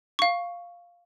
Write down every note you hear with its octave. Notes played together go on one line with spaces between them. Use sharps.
F5 C#6